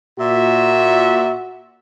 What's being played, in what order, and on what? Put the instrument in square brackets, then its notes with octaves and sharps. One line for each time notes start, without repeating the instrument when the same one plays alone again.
[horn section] A#2 E5 [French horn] F#4